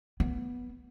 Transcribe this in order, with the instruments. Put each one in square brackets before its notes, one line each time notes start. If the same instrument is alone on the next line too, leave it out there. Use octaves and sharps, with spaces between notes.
[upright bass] B3